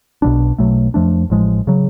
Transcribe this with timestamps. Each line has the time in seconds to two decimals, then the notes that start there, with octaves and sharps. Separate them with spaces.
0.22 B1 B2 G#3 D4
0.58 B1 B2 F#3 A3
0.94 F2 F3 A3 D4
1.30 A1 A2 F3 G#3
1.67 C#3 F#3